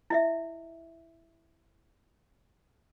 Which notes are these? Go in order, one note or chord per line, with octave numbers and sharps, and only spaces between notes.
E4 D#5 E5